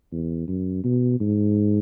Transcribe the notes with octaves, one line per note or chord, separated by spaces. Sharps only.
E2
F#2
B2
G#2